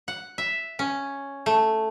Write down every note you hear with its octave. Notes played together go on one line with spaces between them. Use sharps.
F#5
E5
C#4
A3